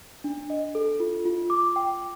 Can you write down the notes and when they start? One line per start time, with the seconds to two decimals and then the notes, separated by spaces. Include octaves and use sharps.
0.24 D4
0.50 D#5
0.75 A4
1.00 F4
1.25 F4
1.50 D6
1.76 G5